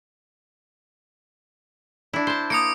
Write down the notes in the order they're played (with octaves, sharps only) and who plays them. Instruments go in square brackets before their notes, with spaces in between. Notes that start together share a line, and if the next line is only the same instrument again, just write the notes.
[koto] D4 E4
C5 A5
[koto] A#3 [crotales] D#6 C#7 D7